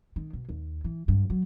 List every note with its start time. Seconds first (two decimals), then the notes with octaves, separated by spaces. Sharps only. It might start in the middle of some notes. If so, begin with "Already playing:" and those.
0.16 D#3
0.33 B2
0.49 D#2
0.84 E3
1.08 G2
1.30 F#3